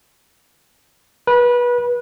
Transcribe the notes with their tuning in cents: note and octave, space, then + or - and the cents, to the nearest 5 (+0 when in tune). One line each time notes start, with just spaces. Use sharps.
B4 -25